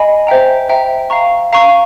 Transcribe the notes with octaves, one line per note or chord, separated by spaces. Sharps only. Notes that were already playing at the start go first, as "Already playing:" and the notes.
Already playing: D#5 G#5 B5
C5 E5 G5 A#5
C5 E5 G5 A#5
F5 A#5 C#6
F5 A#5 C#6